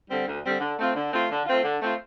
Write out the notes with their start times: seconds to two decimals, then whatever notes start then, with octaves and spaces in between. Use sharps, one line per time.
0.11 D3 G3 C4
0.27 D2
0.44 D3 G3 C4
0.61 D3
0.78 A3 C4 F4
0.95 D3
1.13 A3 C4 F4
1.30 D3
1.46 A3 C4 F4
1.63 D3
1.80 A3 C4 F4